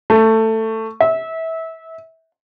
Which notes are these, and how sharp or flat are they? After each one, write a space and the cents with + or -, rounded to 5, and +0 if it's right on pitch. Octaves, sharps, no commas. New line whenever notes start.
A3 +15
E5 -25